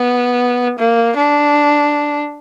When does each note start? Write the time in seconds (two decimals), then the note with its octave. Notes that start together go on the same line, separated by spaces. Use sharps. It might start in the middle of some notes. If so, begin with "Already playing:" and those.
Already playing: B3
0.79 A#3
1.17 D4